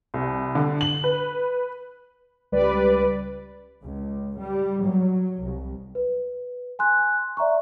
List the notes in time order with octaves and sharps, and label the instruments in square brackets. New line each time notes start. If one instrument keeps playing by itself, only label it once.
[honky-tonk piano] C2
D3
F#7
B4
[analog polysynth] C#2 G3 B4 D5
[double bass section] C#2
G3
F#3
C2
[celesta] B4
G#5 C6 F#6
D5 E5 A#5 C#6